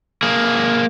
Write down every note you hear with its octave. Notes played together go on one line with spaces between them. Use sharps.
A#3 G#4